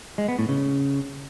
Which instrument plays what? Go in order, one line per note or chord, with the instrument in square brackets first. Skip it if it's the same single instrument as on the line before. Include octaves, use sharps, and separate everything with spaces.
[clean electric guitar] G#3
B3
A2
C#3